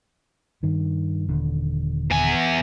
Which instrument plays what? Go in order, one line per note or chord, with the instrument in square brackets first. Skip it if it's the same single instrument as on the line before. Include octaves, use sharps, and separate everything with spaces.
[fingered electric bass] G2 D#3
D#1 D3
[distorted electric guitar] E2 G#5